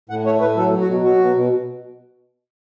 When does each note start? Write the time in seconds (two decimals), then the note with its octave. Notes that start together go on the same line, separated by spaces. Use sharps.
0.09 A2 F#5
0.26 A3 C#5
0.41 A2 B4
0.56 F#3 A4
0.73 F#3
0.81 F#4
0.88 B2
1.04 F#3 F#4
1.20 B2
1.36 B2